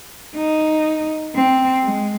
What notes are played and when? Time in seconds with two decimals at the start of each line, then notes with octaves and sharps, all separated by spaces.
0.36 D#4
1.35 C4
1.84 G#3